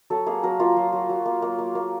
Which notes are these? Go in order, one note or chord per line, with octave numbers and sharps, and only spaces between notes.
F#3 A4
A#3 G#4
F#3 A#4
A#3 F4
F#3
F#3
F#3
A#3
A#3
A#3
A#3